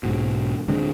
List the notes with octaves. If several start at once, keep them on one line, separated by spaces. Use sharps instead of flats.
B1 G#2 B2
D1 D3 G#3 C4